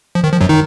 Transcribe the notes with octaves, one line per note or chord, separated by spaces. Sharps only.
F3
D#3
F3
F#2 F#3
D#3 D#4